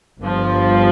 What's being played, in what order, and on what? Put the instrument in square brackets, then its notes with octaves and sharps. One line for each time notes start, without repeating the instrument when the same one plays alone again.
[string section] G1 G2 F3